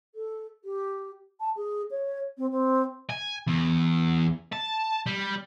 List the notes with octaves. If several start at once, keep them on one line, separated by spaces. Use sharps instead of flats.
A4
G4
A5
G#4
C#5
C4
C4
G#5
E2
A5
G3